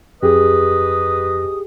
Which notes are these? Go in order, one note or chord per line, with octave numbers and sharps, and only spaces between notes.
F2 G4 G#4 B4 D#5 D#6